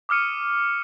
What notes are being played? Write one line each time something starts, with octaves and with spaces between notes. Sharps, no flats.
D6 D#6 F6 C#7 D#7